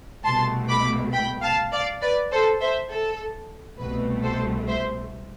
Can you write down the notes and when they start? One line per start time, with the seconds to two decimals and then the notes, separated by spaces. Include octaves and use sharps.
0.24 C2 B2 A3 A5 C6
0.69 B5 D6
1.13 G5 B5
1.42 F5 A5
1.72 D5 F5
2.01 B4 D5
2.32 A4 C5
2.61 C5 E5
2.91 A4
3.79 C2 B2 A3 B4
4.23 A4 C5
4.68 C5 E5